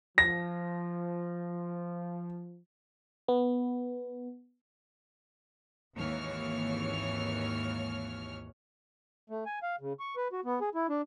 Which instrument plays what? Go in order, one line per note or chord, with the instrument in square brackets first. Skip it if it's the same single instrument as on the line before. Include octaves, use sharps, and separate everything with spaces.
[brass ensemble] F3 [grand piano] A#6
[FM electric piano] B3
[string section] G#1 D#2 E3 C#5 F6
[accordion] A3
G#5
F5
C#3
C#6
B4
F#4
B3
G#4
E4
D4